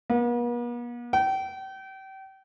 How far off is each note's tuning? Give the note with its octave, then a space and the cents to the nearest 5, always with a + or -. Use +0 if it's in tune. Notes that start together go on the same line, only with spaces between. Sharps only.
B3 -45
G5 -35